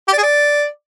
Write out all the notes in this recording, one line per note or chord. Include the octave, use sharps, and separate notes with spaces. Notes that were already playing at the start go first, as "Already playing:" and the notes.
G4
D5
G#4
D5